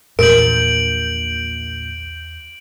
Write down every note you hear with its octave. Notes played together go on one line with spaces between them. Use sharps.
A#1 E2 A#2 A#4 G6 D7 F#7